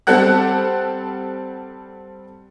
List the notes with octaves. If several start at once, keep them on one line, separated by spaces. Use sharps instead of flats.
G3 C4 G4 A4 F#5 F#6